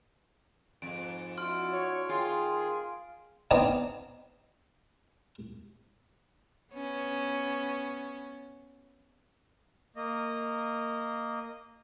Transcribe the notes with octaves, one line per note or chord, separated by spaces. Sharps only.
F2 G#2 D7
D4 E4 F#4 C6 F6 D7
C#5
D#3 A#3 F4 G#4 G5
B3 C4 D4 D#4
B3 C#4
A#3 D#5